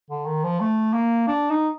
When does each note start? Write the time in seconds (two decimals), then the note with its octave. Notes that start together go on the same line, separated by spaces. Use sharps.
0.11 D3
0.26 D#3
0.44 F3
0.60 A3
0.94 A#3
1.27 D4
1.50 D#4